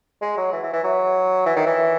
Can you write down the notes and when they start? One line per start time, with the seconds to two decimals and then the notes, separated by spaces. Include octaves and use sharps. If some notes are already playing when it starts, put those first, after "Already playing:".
0.22 G#3
0.37 F#3
0.53 E3
0.63 E3
0.73 E3
0.84 F#3
1.46 E3
1.56 D#3
1.66 E3